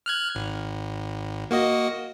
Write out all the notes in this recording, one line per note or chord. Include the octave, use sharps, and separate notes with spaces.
F6 F#6 G#6
G#1
A#3 F#4 D#5